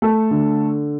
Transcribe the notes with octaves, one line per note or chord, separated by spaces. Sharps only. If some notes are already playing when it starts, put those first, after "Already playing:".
A3 A4
D3